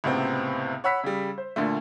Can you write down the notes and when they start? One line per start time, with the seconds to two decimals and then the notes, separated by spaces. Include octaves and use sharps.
0.04 C#2 A2 C3 B3 C4
0.84 C#5 F#5 B5 E6 B6
1.04 C#3 G3
1.38 C5
1.56 D2 A#2 D3 A3